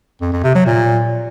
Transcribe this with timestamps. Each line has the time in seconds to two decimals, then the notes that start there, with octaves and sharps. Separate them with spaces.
0.21 F2
0.32 F2
0.44 C3
0.55 F#3
0.66 A#2